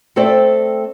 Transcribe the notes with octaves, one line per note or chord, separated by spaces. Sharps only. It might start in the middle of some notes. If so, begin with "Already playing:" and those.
A3 C4 A4 C5 D5 G5